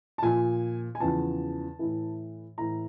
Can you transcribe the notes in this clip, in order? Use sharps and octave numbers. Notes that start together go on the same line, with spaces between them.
A5
A#2 F3 G#5
G#5
E2 C#3 F3 A5
A2 E3
A2 E3 A#5